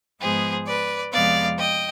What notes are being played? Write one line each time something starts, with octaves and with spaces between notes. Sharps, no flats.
G#2 F3 G#3 B3 G#4 C5
B4 D5
F2 C3 F3 G#3 B3 D5 F5
D#5 G5